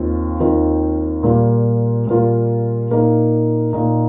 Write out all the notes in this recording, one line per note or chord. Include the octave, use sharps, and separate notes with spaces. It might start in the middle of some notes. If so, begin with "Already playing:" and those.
Already playing: D#2 D#3 C4 F4
D#2 D#3 C4 F4
A#2 G3 A#3 F4
A#2 G3 A#3 F4
A#2 A#3 D#4
A#2 A#3 D#4